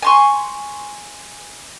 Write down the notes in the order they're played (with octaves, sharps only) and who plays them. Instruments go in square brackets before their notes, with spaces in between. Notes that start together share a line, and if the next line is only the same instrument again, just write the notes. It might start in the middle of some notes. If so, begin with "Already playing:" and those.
[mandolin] G#5 C6 C#6